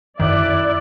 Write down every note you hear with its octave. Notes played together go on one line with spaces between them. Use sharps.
F#2 D#3 E4 D5 F#6